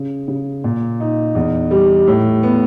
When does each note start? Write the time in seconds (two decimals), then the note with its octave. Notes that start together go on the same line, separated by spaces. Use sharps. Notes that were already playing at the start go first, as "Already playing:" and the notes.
Already playing: C#3
0.28 C#3
0.64 A#2
1.00 D#4
1.35 E2
1.71 G3
2.07 A2
2.43 B3